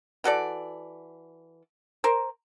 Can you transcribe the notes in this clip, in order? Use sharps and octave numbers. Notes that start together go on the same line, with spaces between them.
E3 F#4 A4 D5
A#4 C5